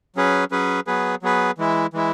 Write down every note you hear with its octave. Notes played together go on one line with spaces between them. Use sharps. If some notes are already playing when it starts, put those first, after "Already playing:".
F#3 C#4 G#4 B4
F#3 C#4 G#4 B4
F#3 B3 G#4 B4
F#3 B3 G#4 B4
E3 G#3 E4
E3 G#3 E4